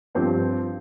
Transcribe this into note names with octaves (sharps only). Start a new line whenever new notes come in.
G2 F3 C4 G4 C5